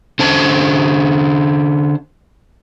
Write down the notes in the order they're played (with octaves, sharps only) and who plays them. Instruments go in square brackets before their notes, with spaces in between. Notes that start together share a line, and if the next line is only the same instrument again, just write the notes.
[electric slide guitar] D3 C#4 C5 A5